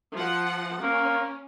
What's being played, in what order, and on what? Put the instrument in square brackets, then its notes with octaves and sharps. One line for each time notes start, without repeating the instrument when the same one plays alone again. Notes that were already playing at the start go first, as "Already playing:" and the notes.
[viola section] F3 F#5
[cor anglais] A#3 [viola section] C#4